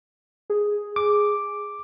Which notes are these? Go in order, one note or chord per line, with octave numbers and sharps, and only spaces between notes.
G#4
D6